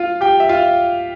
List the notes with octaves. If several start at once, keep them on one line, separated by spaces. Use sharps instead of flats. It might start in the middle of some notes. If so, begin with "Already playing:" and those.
Already playing: F4 F5
G4 G5
E5
F4 F5